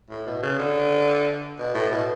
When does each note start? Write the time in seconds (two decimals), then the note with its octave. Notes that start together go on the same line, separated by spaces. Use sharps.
0.10 A2
0.27 B2
0.43 C#3
0.59 D3
1.59 B2
1.75 A2
1.92 B2